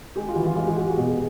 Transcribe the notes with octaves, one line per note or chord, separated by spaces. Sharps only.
G#3 G4
F4
E3 F#4
F4
G#3 F4
G4
G#3 F#4
F#4
B2 G4
G#4